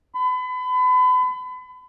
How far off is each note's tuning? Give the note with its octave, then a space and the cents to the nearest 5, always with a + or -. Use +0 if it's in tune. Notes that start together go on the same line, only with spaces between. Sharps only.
B5 +35